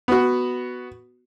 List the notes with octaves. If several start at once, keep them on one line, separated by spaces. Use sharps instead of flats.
B3 F#4